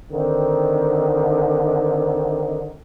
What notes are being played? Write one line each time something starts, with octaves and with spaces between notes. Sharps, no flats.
D3 D#3 C4 D#4